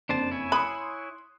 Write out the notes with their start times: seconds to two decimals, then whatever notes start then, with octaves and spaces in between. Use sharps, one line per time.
0.09 F#1 F2 D4 C5 A5
0.31 E4 C#5 G#5
0.52 B5 C6 D#6 F#6